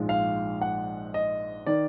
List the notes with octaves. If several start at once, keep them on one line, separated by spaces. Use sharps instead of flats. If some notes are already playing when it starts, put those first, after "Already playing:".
Already playing: A#1 G#2 F3 G#3
F5
F#5
D#5
D#3 D5